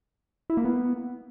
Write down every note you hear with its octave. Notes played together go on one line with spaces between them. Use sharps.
E4
A#3
B3